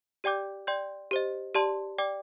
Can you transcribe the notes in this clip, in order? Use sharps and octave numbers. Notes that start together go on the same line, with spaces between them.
G4 D5 G5 D6 G6
D5 G5 C6 G6
G4 C5 D#5
G4 D5 A5 C6
D5 G5 D6